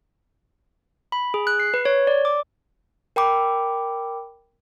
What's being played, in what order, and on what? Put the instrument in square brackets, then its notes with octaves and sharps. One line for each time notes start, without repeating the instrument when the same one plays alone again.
[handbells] B5
G#4
F#6
C7
B4
C#5
D5
D6
[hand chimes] A#4 G5 B5 D6